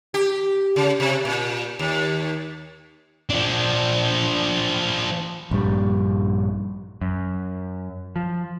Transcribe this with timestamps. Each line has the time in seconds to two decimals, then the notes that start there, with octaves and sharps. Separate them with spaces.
0.14 G4
0.76 C#3
1.00 C3
1.25 A#2
1.79 D#2
3.30 F3 D4
5.51 A#1 G2 G3
7.02 F#2
8.16 F3